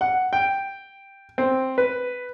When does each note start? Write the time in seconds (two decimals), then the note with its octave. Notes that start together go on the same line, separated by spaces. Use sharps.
0.01 F#5
0.33 G5
1.38 C4
1.78 B4